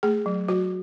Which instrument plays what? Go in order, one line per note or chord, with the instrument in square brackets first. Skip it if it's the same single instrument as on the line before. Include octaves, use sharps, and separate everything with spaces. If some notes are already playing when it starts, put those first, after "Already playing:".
[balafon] A3 G#4
F#3
F#3 F#4